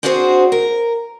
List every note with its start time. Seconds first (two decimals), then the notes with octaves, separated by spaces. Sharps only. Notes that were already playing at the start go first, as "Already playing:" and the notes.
0.03 C4 D4 F#4 G#4 A#4 C5
0.52 A#4